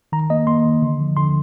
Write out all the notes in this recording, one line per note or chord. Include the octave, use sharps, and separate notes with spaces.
D#3 A#5
A#3 D#5
A#3 C6
D#3
D3
F3
D3 C6